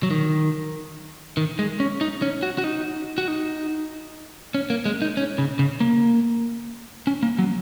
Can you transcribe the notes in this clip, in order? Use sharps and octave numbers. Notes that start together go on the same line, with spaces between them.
F#3
D#3
D#3
G#3
C#4
D#4
C#4
F#4
F#4
D#4
F#4
D#4
C#4
A#3
G#3
D#4
C#4
C#3
C#3
A#3
C#4
A#3
F#3